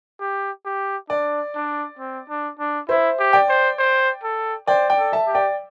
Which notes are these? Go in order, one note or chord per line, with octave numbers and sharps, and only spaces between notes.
G4
G4
D4 D5
D4
C4
D4
D4
E4 C5 E5
G4
D5 G5
C5
C5
A4
C5 D5 G5
D5 G5
A4
E5 A5
G4
D5 G5